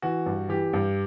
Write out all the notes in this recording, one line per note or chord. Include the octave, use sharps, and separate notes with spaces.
E3 F#4
G2
E3 G4
G2